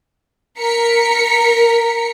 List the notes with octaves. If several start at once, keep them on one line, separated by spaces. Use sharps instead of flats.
A#4 B6 C#7